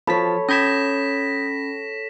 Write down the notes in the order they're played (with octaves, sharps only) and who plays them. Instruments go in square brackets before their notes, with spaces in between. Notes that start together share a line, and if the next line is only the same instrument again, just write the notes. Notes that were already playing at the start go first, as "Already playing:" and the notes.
[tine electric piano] F3 A5 B6 [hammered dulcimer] A4 C#5 [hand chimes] B5
[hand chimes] C#4 B5 [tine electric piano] D#6 G6 G#6 [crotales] A#6 B6 E7